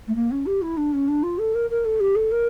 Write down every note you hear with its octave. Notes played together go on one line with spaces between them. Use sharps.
A3
A#3
C#4
G4
E4
D4
C#4
D4
F4
A4
A#4
A#4
A4
G4
A4
A#4